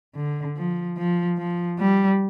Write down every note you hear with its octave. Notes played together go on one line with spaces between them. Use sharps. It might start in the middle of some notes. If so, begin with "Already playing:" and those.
D3
F3
F3
F3
G3